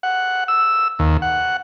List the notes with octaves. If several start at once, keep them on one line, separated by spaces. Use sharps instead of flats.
F#5
E6
D#2
F#5